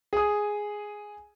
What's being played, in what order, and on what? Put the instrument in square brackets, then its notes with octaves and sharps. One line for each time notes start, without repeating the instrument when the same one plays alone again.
[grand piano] G#4 D#6